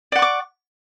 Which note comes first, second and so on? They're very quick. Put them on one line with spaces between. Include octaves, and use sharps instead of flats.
D5 F#5 C#6 D6